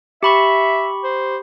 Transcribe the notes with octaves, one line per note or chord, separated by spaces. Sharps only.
G4 E5 B5 C#6
C5